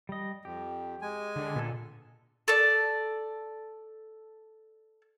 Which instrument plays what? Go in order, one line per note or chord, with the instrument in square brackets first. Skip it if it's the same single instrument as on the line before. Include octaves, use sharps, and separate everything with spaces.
[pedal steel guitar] G3 D#5
[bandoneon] F2 [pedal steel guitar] G4
[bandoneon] G#3 G#5
[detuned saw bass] D3
[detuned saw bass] A#2 [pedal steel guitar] B3 A4
[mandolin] A4 D5